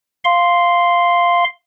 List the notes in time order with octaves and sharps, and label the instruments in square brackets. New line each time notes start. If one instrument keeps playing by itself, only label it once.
[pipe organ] F5 C6